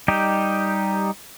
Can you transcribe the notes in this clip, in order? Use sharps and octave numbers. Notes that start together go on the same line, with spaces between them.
G3 D#4 G4